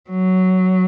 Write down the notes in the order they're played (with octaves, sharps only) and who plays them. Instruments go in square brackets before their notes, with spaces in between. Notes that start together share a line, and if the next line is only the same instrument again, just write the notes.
[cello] F#3